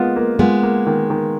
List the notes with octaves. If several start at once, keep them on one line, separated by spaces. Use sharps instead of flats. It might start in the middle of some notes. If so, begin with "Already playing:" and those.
Already playing: G#3 A#3 B3 F4
A#3
G#3 B3 F4
A#3
D#3
D#3